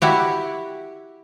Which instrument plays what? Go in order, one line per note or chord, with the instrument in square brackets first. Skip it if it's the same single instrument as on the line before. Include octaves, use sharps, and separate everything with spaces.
[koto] E4 F#4 G4